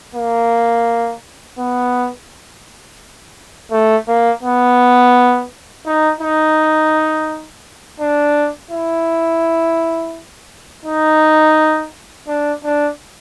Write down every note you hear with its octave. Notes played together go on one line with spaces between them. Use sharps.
A#3
B3
A3
A#3
B3
D#4
D#4
D4
E4
D#4
D4
D4